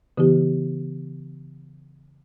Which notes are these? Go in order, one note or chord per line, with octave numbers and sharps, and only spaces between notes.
C#3 E3 B3 E4 G4